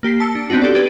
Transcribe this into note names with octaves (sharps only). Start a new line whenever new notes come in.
A#3 G4 B6 C7
A5 E6 C#7
D4
B3 C4 D4 D#4 F#4
G4 A4 D5
G4 B4 G#6 A6 D7 D#7